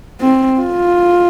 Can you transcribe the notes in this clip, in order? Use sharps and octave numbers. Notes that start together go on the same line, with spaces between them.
C4
F4